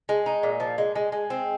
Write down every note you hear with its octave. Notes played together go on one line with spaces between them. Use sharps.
G#3
D#4
A#2
F3
G#3
G#3
G#3
C4